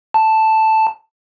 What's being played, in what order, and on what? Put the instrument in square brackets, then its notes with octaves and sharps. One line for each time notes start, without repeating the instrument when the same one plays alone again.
[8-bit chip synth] A5